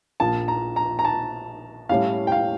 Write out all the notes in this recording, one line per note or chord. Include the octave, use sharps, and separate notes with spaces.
A#1 A#2 F3 A5
A#5
A#5
A#5
A5
A2 G3 C#4 E4 F5
G5
F5